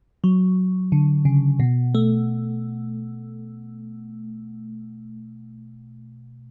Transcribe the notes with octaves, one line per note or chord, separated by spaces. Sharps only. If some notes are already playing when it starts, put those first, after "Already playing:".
F#3
D3
C#3
B2
A3